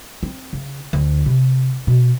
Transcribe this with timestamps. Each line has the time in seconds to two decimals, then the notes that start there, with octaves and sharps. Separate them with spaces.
0.23 C4
0.53 C#3
0.93 D2
1.26 C3
1.87 B2